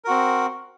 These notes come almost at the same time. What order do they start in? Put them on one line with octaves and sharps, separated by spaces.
A#4 F#4 C4